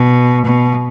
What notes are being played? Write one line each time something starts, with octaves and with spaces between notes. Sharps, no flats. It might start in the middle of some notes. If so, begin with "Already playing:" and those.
Already playing: B2
B2